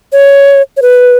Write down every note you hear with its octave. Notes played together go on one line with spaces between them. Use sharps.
C#5
C#5
B4